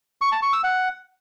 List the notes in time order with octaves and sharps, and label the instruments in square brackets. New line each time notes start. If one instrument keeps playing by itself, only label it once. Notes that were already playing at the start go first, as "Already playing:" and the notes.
[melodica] C#6
A5
C#6
E6
F#5